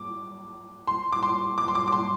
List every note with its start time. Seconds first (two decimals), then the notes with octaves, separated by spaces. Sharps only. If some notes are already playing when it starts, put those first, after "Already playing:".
Already playing: D6
0.87 C6
1.12 D6
1.23 C6
1.58 D6
1.68 C6
1.75 D6
1.87 D6
1.92 C6